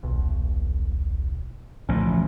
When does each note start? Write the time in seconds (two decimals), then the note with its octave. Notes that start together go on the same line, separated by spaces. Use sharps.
0.03 D#1 B1
1.89 A1 D2 A#2 F3 C#4